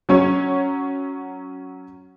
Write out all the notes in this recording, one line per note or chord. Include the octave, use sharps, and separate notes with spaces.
F#3 C#4 C#5